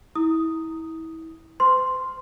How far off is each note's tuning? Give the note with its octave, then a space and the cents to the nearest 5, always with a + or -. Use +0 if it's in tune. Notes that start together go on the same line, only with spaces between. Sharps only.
E4 -30 D#6 +0
C5 -45 C6 +0